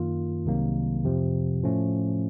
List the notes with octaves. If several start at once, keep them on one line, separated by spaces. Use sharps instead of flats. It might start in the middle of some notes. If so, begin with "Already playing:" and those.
Already playing: F#2 D#3 A#3 F4
C2 C3 D#3 F#3 A#3
F2 C3 F3
A2 F3 A3 C#4